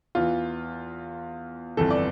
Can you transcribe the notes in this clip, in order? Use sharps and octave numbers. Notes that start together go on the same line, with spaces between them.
E2 E3 F4
G1 F2 E3 A4
D5